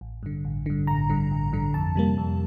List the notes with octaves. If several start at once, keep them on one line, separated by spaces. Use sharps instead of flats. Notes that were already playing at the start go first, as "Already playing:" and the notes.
A1
G2 D3
A1
G2 D3
A1 A#5
G2 D3
A1
G2 D3
F2 A5
C3 G3 A#3
F2